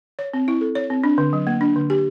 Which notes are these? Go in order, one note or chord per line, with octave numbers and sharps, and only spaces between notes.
C#5
C4
E4
A4
C#5
C4
D4
D3
F#3
A#3
D4
D3
G4